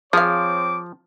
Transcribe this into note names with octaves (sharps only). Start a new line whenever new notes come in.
F3 C4 G#4 C#5 F5 D6